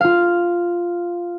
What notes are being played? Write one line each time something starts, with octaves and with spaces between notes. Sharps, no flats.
F4 F5